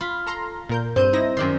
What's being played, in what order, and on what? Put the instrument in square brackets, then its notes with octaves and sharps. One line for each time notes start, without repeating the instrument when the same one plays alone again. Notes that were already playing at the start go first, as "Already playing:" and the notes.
[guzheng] F4 [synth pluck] B5
[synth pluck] A4 A#5 C6
A#2 A#4 G6
[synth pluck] G2 G6 D#7 [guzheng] C4 [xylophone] C5
[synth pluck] D#4 E4 A#6
[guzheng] F#2 D#3 [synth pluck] C4 D5 C6